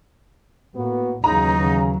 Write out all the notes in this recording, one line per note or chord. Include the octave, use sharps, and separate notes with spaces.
A2 A#3 B3 F#4
D#2 C#3 E3 F#3 D#4 A#5
C#3